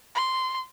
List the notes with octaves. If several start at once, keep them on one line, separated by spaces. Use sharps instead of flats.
C6